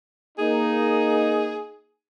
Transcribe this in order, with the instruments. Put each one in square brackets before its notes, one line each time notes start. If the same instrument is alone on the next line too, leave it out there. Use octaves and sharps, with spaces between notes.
[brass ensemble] A#3 D#4 [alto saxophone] G#4